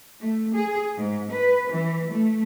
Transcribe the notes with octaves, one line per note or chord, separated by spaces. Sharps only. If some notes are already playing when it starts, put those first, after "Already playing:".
A3
G#4
G#2
B4
E3
A3